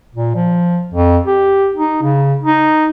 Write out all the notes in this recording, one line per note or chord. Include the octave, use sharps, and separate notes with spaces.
A#2
F3
F2
G4
D#4
C#3
D#4